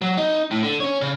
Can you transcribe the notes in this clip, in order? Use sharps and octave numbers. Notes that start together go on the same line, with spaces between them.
F#3
D#4
A2
D3
C#4 C#5
C#3